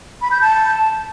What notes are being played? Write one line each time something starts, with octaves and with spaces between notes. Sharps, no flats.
B5
G6
A5